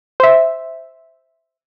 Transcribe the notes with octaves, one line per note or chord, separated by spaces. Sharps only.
C5 E5